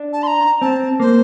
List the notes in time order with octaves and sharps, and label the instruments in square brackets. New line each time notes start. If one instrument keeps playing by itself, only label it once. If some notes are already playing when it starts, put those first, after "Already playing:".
Already playing: [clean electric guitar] D4
[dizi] A5
C6
A#5
[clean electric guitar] C4 [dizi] A5
[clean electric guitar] A#3 [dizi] C5